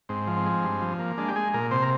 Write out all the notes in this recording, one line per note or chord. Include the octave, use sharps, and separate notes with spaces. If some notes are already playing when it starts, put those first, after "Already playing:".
G#2 C4
F3
C4
G#3
G2
F3
A#3
G#3 D4
G4
G#3 G#4
A#2 A#4
C3 C5
A#4